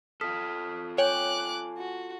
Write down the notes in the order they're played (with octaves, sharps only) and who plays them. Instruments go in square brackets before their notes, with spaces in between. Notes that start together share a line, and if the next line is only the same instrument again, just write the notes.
[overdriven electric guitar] F4 A4 [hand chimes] D#6 F6 B6
[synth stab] C#5 G5 [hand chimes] G#5 [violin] D6 F#6
[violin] F#4